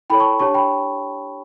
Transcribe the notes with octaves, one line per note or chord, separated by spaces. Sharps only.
E4 A4 C#5 G5 B5
A5 C#6
D4 G4 C#5 A5 C#6
G5 B5